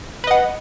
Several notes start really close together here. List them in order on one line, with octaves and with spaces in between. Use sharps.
B4 D#5 F#5